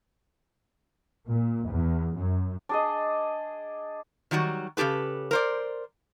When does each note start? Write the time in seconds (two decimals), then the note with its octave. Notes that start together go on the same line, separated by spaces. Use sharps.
1.28 A#2
1.67 E2
2.16 F#2
2.69 D4 G#4 D#5
4.31 D#3 F#3 G3 F#4
4.77 C#3 E3 G4 A4 B4
5.31 A#4 C5 D5